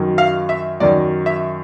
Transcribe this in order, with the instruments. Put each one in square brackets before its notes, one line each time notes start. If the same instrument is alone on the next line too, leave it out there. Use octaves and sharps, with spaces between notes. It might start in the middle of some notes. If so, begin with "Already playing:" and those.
Already playing: [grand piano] F#2 D#3 F#3
F5
E5
F#2 D#3 F#3 D5
E5